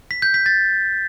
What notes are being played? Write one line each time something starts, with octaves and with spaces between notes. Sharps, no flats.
B6
G6
B6
A6